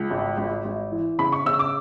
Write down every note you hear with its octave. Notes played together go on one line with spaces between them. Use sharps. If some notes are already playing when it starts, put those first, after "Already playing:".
Already playing: C#2
G#1
G#1
G#1
E3
C#3 B5
C#6
C#3 E6
D6